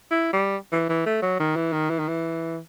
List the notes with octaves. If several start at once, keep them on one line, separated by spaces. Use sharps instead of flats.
E4
G3
E3
E3
A3
F#3
D#3
E3
D#3
E3
D#3
E3